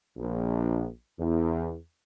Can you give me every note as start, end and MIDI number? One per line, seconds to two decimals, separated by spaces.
0.17 0.86 34
1.17 1.75 40